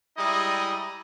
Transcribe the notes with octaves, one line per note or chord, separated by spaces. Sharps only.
G3 G#3 E4 D#5 A#5 D#6